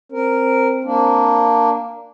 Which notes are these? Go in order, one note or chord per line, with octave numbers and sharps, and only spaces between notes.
C4 A#4
A#3 D4